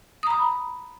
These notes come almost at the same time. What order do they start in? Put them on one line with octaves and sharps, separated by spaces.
D#6 A#5 B5